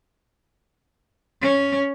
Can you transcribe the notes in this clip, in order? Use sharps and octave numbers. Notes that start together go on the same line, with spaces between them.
C#4